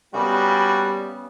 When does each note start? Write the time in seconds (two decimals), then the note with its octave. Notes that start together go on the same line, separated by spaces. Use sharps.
0.14 C#3 G3 A#3 B3 F#4 G4